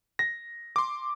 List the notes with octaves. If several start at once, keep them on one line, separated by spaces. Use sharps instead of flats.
A#6
C6 D6